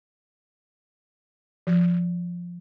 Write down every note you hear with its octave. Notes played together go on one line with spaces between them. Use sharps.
F3